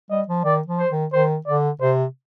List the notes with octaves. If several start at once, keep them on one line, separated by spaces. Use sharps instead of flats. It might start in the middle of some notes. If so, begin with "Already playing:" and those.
G3 D#5
F3
D#3 D5
F3
C5
D#3
D#3 C5
D3 D5
C3 C5